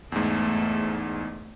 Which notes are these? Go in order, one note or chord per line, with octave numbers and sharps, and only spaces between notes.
E2 G#2 A3